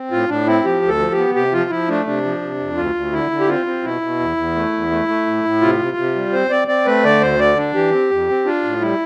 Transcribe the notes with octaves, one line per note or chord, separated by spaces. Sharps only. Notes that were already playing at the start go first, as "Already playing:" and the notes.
Already playing: C4
A2 F4
A2 D4
C4 E4
F3 G4
D2
A4
F3
G4
B3
C3 G4
F3 F4
F3 E4
A3 D4
C3 D4
F3
C3
F2
D2 F4
D2
D3 E4
D3
G4
C4 F4
C4
B2 E4
B2
E2
E2
A3
E2
A3
A3
A2
A2
C3 F4
C3
C3
G3
C4 C5
C4 D5
C4 D5
A3 B4
D3 D5
D2 C5
D3 D5
D4
E3 G4
C4
F2
C4
D4 F4
A2
G3 E4